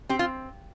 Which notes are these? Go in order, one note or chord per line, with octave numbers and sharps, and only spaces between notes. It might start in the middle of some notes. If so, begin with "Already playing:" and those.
C4 G4
F4